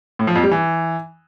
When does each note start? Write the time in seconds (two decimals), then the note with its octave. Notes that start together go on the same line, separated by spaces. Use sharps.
0.19 A2
0.27 F3
0.35 F2
0.43 G3
0.51 E3